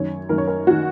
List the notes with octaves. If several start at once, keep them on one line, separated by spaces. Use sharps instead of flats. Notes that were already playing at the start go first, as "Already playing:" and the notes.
Already playing: F#2 D#3 C#5
F#2 D#3 A#4
C#5
A#4
D#3 F#4